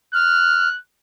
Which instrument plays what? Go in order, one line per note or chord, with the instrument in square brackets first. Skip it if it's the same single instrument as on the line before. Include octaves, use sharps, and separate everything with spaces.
[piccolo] F6 [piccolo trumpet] F#6